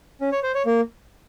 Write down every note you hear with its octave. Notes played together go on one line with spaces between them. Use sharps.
C#4
C#5
C5
C#5
A#3